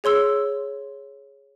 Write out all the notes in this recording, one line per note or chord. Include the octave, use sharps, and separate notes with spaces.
G#4 C#5 C6 E6